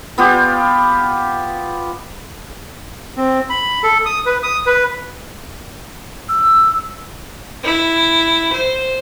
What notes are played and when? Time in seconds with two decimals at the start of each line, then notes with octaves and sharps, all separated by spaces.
0.18 B3 F4 G4
3.17 C4
3.50 B5
3.83 A4
4.05 D#6
4.26 B4
4.43 D#6
4.66 B4
6.29 E6
7.63 E4
8.52 C5